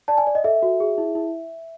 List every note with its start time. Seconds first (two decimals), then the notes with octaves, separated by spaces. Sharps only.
0.08 D5 A5
0.18 G#5
0.27 D5
0.35 D#5
0.44 A4 E5
0.63 F#4
0.80 G#4
0.98 E4
1.15 E4